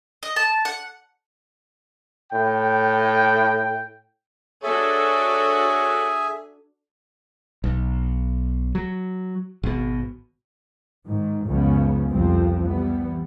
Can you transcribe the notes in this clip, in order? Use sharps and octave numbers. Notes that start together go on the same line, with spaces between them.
D#5
A5
F#5
A2 G5
D4 F#4 G#4 A4 C#5 E5 G#5
B1
F#3
G#1 B2
G#2 D#3
C#2 F#2 C#3 F3 B3 C#4
C2 F2 F3 C4
C3 E3 G3 B3